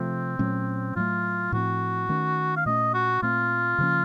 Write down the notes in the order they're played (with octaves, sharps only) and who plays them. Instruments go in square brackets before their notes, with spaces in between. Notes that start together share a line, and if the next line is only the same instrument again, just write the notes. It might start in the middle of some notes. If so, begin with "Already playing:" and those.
Already playing: [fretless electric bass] C3 F3 A3 [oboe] C4
[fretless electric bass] A#2 F#3 A3 C#4
[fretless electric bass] A2 F#3 A3 [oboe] F4
[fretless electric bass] A2 F3 C4 [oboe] F#4
[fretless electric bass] D#3 A3 C#4
[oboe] F5
[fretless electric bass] A#2 A3 C#4 [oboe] D#5
[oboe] F#4
[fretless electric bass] A#2 A3 C4 [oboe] F4
[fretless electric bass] C#3 F3 A#3 C#4